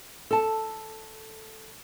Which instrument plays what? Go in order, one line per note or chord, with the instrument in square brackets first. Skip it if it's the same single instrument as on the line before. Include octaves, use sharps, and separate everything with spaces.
[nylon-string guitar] A4 A5